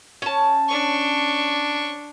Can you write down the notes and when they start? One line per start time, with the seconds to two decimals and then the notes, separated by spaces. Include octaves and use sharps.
0.22 C#4 A5
0.69 D4 C#6